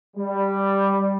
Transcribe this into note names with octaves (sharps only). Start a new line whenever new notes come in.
G3